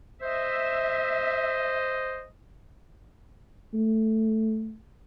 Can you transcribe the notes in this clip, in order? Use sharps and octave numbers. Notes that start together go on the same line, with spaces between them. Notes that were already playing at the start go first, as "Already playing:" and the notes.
C5 D#5 E5
A3